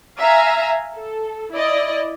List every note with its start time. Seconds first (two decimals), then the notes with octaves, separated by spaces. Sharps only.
0.17 E5 F5 G#5 A#5
0.94 A4
1.52 E4 D5 D#5